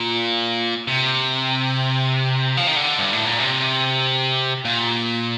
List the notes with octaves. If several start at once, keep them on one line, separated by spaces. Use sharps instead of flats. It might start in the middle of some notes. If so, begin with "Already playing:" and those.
Already playing: A#2
C3
F3
D#3
D3
G2
A2
A#2
C3
A#2